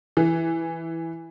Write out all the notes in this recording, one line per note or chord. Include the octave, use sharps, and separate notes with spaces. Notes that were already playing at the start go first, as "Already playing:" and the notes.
E3